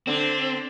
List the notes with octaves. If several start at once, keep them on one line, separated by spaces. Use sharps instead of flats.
D3 C4